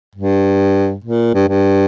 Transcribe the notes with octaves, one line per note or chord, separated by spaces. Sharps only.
G2
A#2
G2
G2